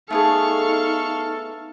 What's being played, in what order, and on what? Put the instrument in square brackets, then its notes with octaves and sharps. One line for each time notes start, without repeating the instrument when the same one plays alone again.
[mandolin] A3 B3 G#4 [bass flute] D#4 [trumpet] A4 [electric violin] F5 C#6